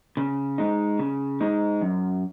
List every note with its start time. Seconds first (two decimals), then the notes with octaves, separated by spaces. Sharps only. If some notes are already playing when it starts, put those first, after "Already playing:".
0.17 C#3
0.58 G#3 D#4
0.99 C#3
1.41 G#3 D#4
1.81 F#2